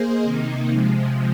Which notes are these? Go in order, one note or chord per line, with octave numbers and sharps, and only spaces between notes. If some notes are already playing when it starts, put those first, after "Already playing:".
Already playing: A#3 G#4 C5 D#5
C3 D#3 A#3 D#4
C3 F3 G#3